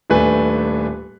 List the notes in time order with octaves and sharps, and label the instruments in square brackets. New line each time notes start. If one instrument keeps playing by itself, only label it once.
[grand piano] D#1 A3 D4 B4 G#5